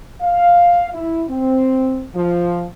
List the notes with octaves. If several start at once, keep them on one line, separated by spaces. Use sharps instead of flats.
F5
E4
C4
F3